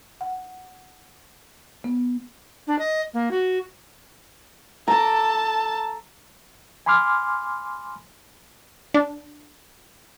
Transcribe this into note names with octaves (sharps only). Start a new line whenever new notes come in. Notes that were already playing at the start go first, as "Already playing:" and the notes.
F#5
B3
D4
D#5
A#3
F#4
A4 A5 A#5 D6
G#5 B5 C6 D6 F6
D4